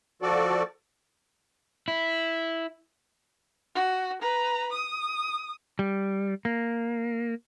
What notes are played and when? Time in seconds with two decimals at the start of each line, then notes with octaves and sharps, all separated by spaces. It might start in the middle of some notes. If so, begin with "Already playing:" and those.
0.22 F3 F#4 A4 D5
1.88 E4
3.75 F#4
4.22 B4 A#5
4.72 D#6
5.79 G3
6.45 A#3